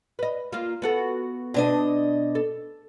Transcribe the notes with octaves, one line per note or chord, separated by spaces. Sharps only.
B4 D#5
A#3 F4
B3 F#4 A4
B2 D4 D#5
A4